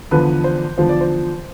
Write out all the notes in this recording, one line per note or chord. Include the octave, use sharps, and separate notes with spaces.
E2 D3 F3 B4
C5
E2 D3 F3 C5
D5
C5